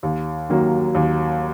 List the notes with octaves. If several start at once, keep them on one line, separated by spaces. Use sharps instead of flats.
D#2
D#3 F#3 A#3
D#2